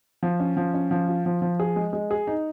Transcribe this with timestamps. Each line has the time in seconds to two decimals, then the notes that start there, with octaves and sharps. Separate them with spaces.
0.23 F3
0.40 C#4
0.57 F3
0.74 C#4
0.91 F3
1.08 F4
1.26 F3
1.42 F3
1.60 G#4
1.76 G#3
1.93 G#3
2.11 G#4
2.27 D#4